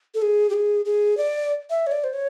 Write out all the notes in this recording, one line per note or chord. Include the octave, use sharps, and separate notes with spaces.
A4
G#4
G4
G#4
G#4
D5
E5
C#5
D5
C5
C#5